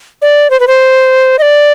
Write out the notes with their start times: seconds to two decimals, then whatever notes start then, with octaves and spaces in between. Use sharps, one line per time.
0.22 D5
0.50 C5
0.60 B4
0.67 C5
1.39 D#5
1.42 D5